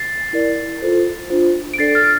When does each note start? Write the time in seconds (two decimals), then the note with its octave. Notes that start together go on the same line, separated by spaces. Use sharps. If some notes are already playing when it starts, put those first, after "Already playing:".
Already playing: A6 C7
0.33 E4 A#4 D5
0.82 F4 A4 C5
1.30 D4 F4 C5
1.74 D7
1.78 D4 A4 D5 A6 C7
1.95 F6 A6